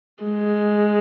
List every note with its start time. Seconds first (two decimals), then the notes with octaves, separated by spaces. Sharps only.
0.24 G#3